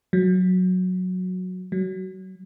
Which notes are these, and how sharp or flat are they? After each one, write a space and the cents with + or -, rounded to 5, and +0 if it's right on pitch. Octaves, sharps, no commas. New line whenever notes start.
F#3 -10
F#3 +20